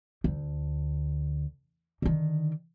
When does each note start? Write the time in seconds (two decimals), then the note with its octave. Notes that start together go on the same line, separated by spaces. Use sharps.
0.24 D2
2.02 D3 D#3